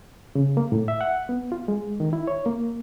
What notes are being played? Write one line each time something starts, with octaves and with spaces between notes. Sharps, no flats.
C#3
A#3
A2
E5
F#5
B3
F4
G#3
D#3
E4
C#5
A#3